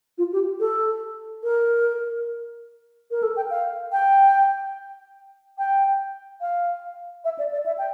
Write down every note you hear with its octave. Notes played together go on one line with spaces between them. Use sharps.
F4
G4
A4
A#4
A#4
A4
G5
F5
G5
G5
F5
E5
D5
D5
E5
G5